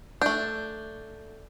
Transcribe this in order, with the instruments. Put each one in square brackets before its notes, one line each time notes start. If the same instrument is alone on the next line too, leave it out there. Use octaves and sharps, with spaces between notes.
[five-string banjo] A3 D4 [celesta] G6